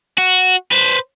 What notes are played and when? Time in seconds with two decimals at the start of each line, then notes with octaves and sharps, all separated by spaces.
0.18 F#4
0.72 B4 C5